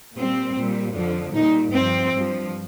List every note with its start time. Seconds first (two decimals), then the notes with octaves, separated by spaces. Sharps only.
0.16 A#2 G3 C4
0.55 A#2 G3
0.94 F2 D3 F3
1.34 A#2 G3 D#4
1.73 G2 F3 C4
2.12 G2 F3